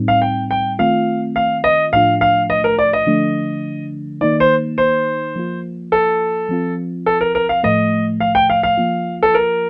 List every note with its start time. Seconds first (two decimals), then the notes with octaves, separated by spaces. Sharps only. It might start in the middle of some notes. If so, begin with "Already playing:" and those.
Already playing: A2 G3 C4 D#4
0.08 F5
0.22 G5
0.51 G5
0.79 D#3 A3 C4 F4 F5
1.36 F5
1.64 D#5
1.93 A2 F3 A3 D4 F4 F5
2.21 F5
2.50 D#5
2.64 A#4
2.79 D5
2.93 D#5
3.07 D3 F3 A3 D4
4.21 D#3 A#3 D#4 D5
4.40 C5
4.78 C5
5.36 F3 A#3 F4
5.92 A4
6.49 F3 C4 F4
7.06 A4
7.21 A#4
7.35 A#4
7.49 F5
7.63 A2 F3 A3 D#5
8.20 F5
8.35 G5
8.50 F5
8.63 F5
8.77 F3 A#3 F4
9.23 A4
9.34 A#4